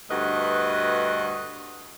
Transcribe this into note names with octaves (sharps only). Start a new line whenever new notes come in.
D2 G2 F#4 B4 D#5